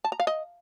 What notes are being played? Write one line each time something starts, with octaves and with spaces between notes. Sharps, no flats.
A5
A#5
F5
D#5